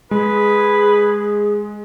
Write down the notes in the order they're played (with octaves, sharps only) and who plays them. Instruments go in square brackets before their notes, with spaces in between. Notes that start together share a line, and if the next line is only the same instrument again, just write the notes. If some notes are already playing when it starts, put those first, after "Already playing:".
[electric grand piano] G#3 [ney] G#4 [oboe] B4